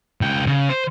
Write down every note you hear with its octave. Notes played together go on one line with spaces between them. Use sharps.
C#2 G5
C#3
C5